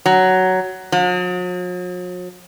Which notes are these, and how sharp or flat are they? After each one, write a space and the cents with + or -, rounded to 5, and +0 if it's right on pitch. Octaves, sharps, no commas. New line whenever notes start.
F#3 +10
F#3 -45